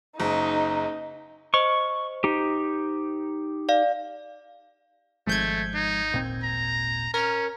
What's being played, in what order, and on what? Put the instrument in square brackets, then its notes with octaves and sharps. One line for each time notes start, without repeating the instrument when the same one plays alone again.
[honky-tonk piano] F#1 [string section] D#4
[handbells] C5 D#5 [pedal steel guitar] C#6
[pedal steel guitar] D#4 G4
[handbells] D5 F5
[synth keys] G#1 G6 G#6 [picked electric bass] F3 G#3 [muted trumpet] A3
[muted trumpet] D#4
[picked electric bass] D#1 A#2 C4
[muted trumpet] A#5
[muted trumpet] C#4 [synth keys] A#4 F6